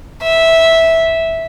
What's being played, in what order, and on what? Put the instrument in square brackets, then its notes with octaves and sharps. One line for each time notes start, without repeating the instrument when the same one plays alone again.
[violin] E5